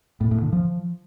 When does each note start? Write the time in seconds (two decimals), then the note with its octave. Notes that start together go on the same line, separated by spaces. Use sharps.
0.21 A2
0.31 A2
0.42 D3
0.53 F3